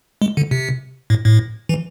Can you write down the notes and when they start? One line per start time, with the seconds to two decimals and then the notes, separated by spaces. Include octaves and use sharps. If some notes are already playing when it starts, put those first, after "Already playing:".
0.22 G#3
0.37 D3
0.51 C3
1.10 A2
1.25 A2
1.69 E3